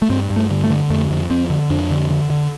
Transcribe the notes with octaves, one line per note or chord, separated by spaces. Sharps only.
A3
G2 C4
G2
A3
D3
A3
D3
F2 A3
F2
F2 C4
D3
F2 D4
D3
D3
D3